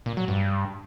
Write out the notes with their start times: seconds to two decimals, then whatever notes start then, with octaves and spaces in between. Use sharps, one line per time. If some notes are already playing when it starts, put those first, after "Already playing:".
0.06 A#2
0.17 F#3
0.28 G2